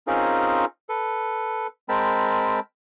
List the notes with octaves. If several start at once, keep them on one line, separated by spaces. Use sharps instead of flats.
C4 C#4 D#4 F4 G#4 A#4
A4 B4
G#3 C4 A#4 G5 A5 B5